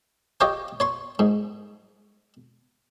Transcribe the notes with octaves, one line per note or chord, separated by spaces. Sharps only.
G4 C#5 D#5 F5 G5 C#6
C#5 C6 C#6
G#2